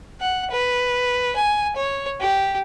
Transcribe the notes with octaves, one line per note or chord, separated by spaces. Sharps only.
F#5
B4
G#5
C#5
G4